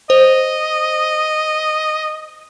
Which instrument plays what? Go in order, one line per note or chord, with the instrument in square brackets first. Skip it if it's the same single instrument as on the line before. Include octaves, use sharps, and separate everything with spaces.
[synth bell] C5 [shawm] D#5